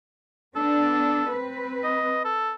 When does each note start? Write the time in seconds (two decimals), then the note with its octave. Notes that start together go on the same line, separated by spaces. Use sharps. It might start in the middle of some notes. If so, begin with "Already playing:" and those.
0.56 B3 D4 A4
1.30 C4 B4
1.84 D#5
2.25 A4